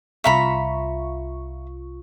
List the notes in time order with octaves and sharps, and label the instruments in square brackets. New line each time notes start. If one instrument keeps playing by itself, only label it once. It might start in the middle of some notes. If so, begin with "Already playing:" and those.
[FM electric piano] C2 F4 C#6 [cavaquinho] E5 A#5 B5